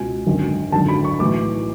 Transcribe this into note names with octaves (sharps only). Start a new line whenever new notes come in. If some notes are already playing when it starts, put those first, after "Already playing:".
Already playing: C#2 B2 G#5
G#1 F#2 D3
G#1 F#2 D3 A5
B5
C#6
B1 A2 E3 D6